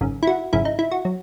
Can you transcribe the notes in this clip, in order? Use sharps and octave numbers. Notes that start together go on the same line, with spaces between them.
G#1 F#2 C#3
E4
F#4
G#1 F#2 C#3 E4
D#4
E4
F#4
F#3